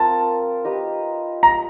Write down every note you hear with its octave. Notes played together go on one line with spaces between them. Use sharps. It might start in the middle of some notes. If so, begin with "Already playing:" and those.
Already playing: C4 F4 A#4 A5
D#4 G4 B4 D#5
A#5